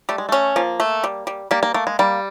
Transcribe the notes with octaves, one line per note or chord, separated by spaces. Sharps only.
G3 A3
G#3
A3 C#4
F3 A#3
A3
G3
G3
G3 A#3
A#3
A3 A#3
G#3
G3 A#3